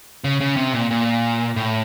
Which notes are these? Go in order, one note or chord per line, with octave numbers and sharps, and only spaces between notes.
C#3
C#3
C3
A#2
A#2
A2